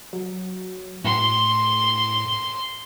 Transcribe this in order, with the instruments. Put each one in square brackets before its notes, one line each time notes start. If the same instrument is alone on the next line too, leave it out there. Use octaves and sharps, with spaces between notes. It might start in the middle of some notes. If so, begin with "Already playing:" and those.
[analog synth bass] F#3
[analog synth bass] A2 [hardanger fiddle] C6